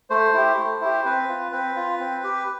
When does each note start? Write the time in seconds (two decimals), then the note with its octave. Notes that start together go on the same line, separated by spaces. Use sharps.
0.10 A3 C5
0.34 E4 G4
0.58 A3
0.81 E4 G4
1.05 C4 B4
1.29 F4
1.52 C4 B4
1.76 F4
2.00 C4
2.24 G4